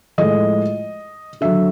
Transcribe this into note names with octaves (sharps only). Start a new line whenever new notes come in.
A2 F3 G#3 D#5
D3 F#3 E5